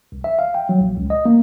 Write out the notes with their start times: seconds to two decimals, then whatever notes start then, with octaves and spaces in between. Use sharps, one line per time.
0.12 C2
0.24 E5
0.39 F5
0.55 G5
0.69 F#3
0.81 A#1
0.97 C#2
1.10 D#5
1.25 A#3